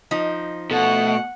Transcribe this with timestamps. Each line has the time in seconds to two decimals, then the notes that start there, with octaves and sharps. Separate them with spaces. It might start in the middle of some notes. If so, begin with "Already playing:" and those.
0.11 F3 D#4
0.71 B2 A3 F#5